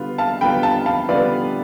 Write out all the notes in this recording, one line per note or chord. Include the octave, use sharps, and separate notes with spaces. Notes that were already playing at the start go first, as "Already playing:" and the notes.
Already playing: D3 G3 B3 F4
F5 A5
D3 G3 B3 F4 G5 B5
F5 A5
F5 A5
D3 G3 B3 F4 B4 D5